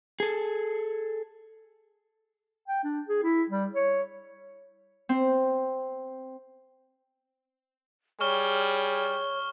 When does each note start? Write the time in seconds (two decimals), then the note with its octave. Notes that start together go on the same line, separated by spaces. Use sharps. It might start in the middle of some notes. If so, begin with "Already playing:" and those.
0.20 G#4 A4
2.68 G5
2.84 D4
3.08 G#4
3.23 E4
3.50 G3
3.74 C#5
5.09 C4
8.21 G3 G#4 C#5 C#6 F6 G7